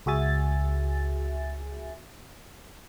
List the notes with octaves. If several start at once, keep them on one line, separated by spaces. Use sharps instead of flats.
C#2 F#4 G#4 E5 G#5 A6